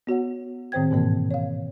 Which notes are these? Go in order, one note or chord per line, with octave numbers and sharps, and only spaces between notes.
B3 F#4 C#5 F#5
A2 D#3 C4 C5 G5 G#6
G#2 B2 E3 A#3
C#5 F5